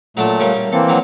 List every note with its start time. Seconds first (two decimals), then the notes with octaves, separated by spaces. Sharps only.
0.17 A#2 F#3 A3 D4 A5
0.40 C#3 G3 A#3
0.72 E3 A#3 C4 A4
0.88 E2 F#3 D6